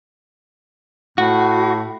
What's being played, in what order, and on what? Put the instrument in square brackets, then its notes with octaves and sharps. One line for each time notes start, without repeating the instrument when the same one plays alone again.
[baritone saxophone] A2 [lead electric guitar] F#4